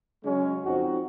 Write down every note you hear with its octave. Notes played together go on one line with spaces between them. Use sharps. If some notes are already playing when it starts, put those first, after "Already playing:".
C#3 F#3 G#3 C#4
F2 C4 D#4 F#4